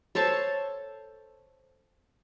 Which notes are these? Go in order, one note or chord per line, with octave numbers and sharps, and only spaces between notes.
A4 C5 C#5 A5